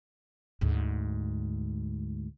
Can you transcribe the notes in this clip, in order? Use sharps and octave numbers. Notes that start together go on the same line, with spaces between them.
D2 G#2